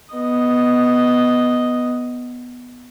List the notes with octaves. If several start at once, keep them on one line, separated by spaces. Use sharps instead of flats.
B3 D#5